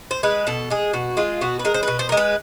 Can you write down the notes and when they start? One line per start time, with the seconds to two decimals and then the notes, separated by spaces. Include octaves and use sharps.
0.11 C5
0.23 G#3 B4
0.47 B2 A4
0.70 G#3 G#4
0.93 B2 F#4
1.17 G#3 F4
1.41 B2 F#4
1.59 B4
1.65 G#3 A#4
1.74 C5
1.83 B2 B4
1.99 C5
2.09 A#4
2.12 G#3
2.17 B4